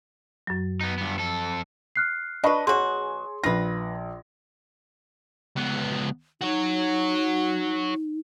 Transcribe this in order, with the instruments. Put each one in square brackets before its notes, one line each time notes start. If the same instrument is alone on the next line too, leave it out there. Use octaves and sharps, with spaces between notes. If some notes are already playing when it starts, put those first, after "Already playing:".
[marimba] F#2 F#3
[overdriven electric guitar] B3 D#4
G2 B3
F2 A4
[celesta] F6 F#6 C7
[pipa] D4 B4 [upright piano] D#5 B5 C#6
[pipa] B2 F#3 F#4 [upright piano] G#4 C#5 [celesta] C6
[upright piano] A#1 A#6 [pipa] F4 B4
[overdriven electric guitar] C#2 B3
[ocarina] D#4 [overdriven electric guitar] F#4 C#5